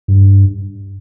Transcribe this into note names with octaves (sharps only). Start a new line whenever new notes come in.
G2